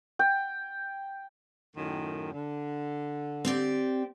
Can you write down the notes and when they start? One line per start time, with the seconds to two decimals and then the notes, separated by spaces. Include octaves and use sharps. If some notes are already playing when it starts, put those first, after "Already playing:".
0.19 G5
1.76 F#2 A2 D#3
2.32 D3
3.45 C4 G4 D5